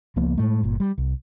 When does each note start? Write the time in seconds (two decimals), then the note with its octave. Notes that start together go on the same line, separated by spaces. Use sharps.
0.16 C#2 F3 A#3 B3
0.38 A2 G#3 A3
0.63 G1 A#2
0.80 G3
0.98 C2